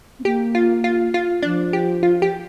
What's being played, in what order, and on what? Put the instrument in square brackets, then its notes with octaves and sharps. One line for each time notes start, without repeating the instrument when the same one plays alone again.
[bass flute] C4
[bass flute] A#3 [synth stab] G4
[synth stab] F4
F4
F4
[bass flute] F3 [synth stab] D4
[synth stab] G4
F4
G4